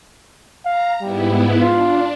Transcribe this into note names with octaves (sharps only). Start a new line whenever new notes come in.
F5 A#5
G#2 G3 B3 E4
D4 F4